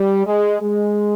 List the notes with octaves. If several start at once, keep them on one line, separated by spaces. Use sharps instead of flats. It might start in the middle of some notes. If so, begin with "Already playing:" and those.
Already playing: G3
G#3
G#3